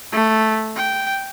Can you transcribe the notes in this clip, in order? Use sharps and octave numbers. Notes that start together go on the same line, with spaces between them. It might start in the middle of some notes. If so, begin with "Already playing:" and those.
A3
G5